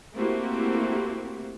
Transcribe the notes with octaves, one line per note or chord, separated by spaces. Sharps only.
A3 A#3 C4 E4 F#4 G4